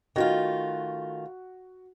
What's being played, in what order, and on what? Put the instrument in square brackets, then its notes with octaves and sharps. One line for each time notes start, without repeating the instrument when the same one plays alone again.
[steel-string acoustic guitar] D#3 A3 F4 [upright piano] F#4